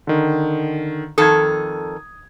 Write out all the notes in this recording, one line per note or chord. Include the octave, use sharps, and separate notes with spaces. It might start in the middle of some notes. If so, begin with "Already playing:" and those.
D3 D#3
F2 D#3 A4 D#6 G#6